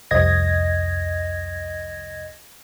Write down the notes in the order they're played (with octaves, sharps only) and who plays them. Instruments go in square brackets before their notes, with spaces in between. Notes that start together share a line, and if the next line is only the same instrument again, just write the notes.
[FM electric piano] C2 F2 D#5 G#6 A#6